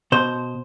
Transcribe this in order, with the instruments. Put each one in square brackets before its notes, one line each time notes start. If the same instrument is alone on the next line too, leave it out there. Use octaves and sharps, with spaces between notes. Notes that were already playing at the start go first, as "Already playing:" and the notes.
[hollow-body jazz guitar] B2 C5